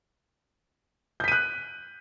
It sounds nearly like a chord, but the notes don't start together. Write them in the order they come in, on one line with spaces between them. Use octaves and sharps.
G6 B6 D#7 F#6